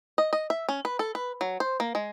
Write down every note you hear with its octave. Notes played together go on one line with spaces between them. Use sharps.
D#5
D#5
E5
C#4
B4
A4
B4
F#3
C5
A#3
G#3